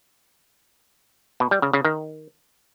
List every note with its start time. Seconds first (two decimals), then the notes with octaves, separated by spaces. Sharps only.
1.40 B2
1.51 G3
1.62 C#3
1.73 C#3
1.85 D#3